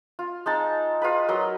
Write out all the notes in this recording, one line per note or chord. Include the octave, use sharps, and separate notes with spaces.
F4
G#3 D#4 A5
F4 G#4 B4 B5
F#3 A#4 D#5 B5